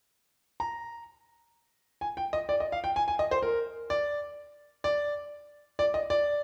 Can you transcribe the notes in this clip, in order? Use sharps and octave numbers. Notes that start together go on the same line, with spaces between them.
A#5
G#5
G5
D#5
D5
D#5
F5
G5
G#5
G#5
D#5
C5
A#4
D5
D5
D5
D#5
D5